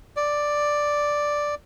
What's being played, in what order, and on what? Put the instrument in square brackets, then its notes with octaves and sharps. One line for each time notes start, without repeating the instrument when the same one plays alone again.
[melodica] D5